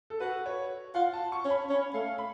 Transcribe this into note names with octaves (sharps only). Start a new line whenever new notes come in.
A4
F#4 B4
C#5
F4 F#5
A5
C#6
C#4
B5
C#4
A3 F5
B5